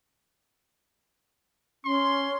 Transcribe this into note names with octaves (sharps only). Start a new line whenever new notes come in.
C#4 C6